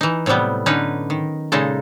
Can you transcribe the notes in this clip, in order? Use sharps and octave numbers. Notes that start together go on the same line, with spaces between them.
E3 D#4
A2 C3 F#3 G3 B3
D3 C#4 D#4 B4
D#3
A#2 C#3 G#3 D#4 A4